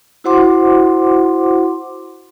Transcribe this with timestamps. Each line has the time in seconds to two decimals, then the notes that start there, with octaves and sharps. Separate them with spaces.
0.24 E4 F#4 C5 F#5 C6 D6